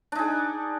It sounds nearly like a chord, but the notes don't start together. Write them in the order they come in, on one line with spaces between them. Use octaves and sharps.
D4 D#4 G#4